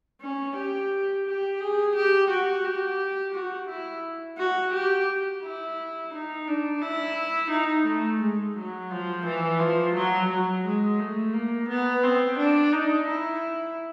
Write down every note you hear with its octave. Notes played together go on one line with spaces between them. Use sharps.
C#4
G4
G4
G#4
G4
F#4
G4
F#4
E4
F#4
G4
E4
D#4
D4
E4
D#4
A3
G#3
F#3
F3
E3
F3
F#3
F#3
G#3
A3
A#3
B3
C4
D4
D#4
E4